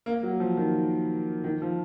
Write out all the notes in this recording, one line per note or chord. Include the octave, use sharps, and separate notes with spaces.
A#3
F#3
F3
D#3
D#3
F3